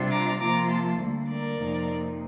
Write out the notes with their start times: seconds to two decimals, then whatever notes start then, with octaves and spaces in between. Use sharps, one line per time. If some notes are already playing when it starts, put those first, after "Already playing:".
Already playing: C3 G3 D4 F4
0.10 A#5 D6
0.40 C3 F3 A#3 F4 A#5 D6
0.69 A5 C6
0.98 D2 D3 G3 A#3
1.28 A#4 D5
1.58 F2 C3 F3 A#3 D#4